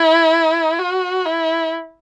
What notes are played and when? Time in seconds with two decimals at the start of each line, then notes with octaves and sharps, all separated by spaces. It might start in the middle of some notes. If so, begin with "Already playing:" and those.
Already playing: E4
0.79 F#4
1.25 E4